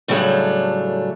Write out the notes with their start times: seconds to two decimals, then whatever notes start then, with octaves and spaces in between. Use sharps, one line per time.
0.08 A2 C#3 F#3 G3 A3 D4